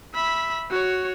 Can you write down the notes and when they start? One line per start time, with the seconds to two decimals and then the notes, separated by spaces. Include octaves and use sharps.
0.14 E5 B5
0.70 F#4 C#5